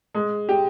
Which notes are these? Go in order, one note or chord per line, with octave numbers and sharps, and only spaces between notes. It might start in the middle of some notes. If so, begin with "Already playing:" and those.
G#3
G4